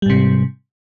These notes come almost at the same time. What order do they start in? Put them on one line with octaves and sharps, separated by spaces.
G3 G#2 C3